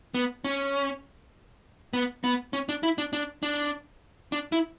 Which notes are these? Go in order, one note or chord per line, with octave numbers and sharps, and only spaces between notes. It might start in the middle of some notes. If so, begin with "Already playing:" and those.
B3
C#4
B3
B3
C#4
D4
E4
D4
D4
D4
D4
E4